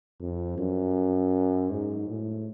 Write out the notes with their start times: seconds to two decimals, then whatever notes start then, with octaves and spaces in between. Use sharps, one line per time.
0.20 F2
0.58 F#2
1.71 G#2
2.08 A2